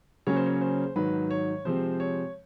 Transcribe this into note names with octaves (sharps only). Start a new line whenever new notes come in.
C#3 F#3 A#3 C#4 C#5
C5
C#5
C5
G#2 D#3 F#3 B4
C#5
C3 F3 G#3 C4 C5
C#5